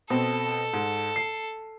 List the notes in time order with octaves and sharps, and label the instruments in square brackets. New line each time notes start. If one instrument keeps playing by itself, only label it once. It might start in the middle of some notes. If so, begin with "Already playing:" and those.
[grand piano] B2 C4 [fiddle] A4
[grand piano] G#2
C7